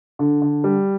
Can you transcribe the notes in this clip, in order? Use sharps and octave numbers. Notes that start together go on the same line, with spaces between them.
D3
D3
G3